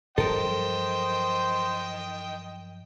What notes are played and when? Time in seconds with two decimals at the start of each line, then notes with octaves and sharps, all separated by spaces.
0.18 G2 F3 F#3 A4 A#4 C5 D#5 G5